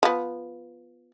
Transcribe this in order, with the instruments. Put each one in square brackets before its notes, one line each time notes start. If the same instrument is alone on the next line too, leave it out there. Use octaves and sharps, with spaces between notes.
[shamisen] F3 B3